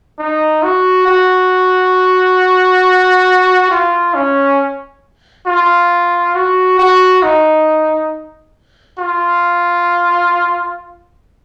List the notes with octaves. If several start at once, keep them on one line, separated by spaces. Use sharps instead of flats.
D#4
F#4
F#4
F4
C#4
F4
F#4
F#4
D#4
F4